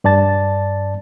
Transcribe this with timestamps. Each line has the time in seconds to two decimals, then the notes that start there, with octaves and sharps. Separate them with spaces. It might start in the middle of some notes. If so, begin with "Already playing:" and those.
0.04 G2 D5 A5 A6